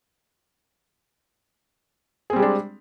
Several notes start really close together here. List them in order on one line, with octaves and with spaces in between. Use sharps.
G#4 C4 G3 G#3 D4